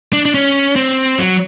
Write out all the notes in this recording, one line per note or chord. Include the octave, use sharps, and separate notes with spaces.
D4
D4
C#4
C4
F#3